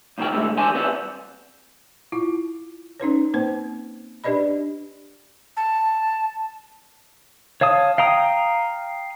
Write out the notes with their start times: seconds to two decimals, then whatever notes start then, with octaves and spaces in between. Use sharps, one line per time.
0.18 F#2 B2 D#3 F3 G5
0.32 G#2 B2 D3 G#3 A3
0.57 E2 G4 C5 G#5 A5 C6
0.74 G2 C4 B4 D5
2.12 E4 F4
3.00 C#4 D#4 B4 C#5
3.34 A#3 C4 B4 C5
4.24 D4 G4 B4 D5 D#5 B5
5.57 A5
7.61 C#5 F5 A5 D#6
7.98 F5 G5 A#5 D#6